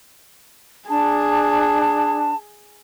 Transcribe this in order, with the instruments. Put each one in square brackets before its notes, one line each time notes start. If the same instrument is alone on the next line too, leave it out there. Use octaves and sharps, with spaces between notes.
[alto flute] D4 [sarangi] G#4 [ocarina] A5